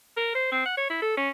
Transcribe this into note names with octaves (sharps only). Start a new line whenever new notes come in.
A#4
C5
C4
F#5
C#5
E4
A4
C#4